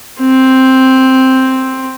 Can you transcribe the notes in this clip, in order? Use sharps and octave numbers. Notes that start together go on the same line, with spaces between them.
C4